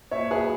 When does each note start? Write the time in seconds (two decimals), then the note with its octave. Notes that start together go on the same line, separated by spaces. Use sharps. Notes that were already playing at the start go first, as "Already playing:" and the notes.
0.11 A#2 C#5 E5
0.31 G#4 B4
0.39 F#3